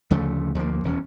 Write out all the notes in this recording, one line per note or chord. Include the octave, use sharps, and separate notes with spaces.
D2 C#3 F3 A3
D2 F3 G#3 A#3
D#1 E2 C#4